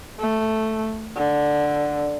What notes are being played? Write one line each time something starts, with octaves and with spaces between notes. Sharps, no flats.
A3
D3